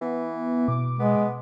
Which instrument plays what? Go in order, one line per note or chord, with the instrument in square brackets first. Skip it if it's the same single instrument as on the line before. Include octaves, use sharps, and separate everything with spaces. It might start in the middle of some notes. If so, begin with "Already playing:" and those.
[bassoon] E3 [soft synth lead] B3
[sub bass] B2 [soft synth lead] D6
[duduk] G#3 [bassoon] B3